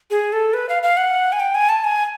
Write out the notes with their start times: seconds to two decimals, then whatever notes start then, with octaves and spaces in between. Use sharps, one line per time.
0.11 G#4
0.33 A4
0.54 B4
0.69 F5
0.83 F5
0.97 F#5
1.32 G#5
1.40 G5
1.55 G#5
1.69 A5
1.84 G#5